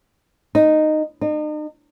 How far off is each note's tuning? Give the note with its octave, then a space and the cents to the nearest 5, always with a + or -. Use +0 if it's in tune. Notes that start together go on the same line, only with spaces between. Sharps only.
D#4 -10
D#4 -40